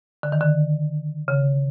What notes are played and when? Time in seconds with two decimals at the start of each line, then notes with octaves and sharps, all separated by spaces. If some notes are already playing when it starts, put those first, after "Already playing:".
0.23 D3
0.32 D#3
0.41 D3
1.28 C#3